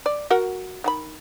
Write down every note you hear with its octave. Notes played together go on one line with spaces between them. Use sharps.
D5
F#4 A#4 F#5
D#3 F#5 B5